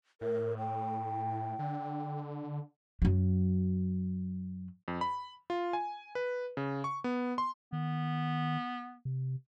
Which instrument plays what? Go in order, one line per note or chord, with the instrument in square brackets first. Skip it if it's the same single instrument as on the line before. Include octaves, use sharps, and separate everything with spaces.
[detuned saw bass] A2 [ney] A#4
[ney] G5
[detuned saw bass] D3
[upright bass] F#2 F#3
[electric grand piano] F2
B5
F4
G#5
B4
C#3
C#6
B3
C6
[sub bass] D#3 [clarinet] B3
[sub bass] C3